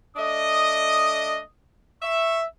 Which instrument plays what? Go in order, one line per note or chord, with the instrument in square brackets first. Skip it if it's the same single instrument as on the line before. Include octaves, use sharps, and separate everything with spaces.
[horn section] A3 D4 D#5 [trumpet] D#6
[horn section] E5 [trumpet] C#6